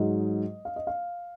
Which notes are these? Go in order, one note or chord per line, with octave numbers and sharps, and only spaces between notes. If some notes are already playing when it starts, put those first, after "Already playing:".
Already playing: G#2 F#3 D#5
F5
D#5
F5